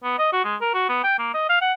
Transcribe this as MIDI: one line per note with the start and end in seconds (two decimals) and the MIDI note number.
0.04 0.15 59
0.18 0.31 75
0.33 0.44 66
0.44 0.56 56
0.61 0.69 70
0.74 0.88 66
0.89 1.00 59
1.04 1.16 79
1.19 1.33 58
1.34 1.47 75
1.49 1.57 77
1.61 1.72 78